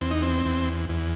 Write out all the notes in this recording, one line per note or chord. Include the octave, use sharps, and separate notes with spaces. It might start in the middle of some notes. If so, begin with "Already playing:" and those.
E2 C4
D#4
C4
E2
E2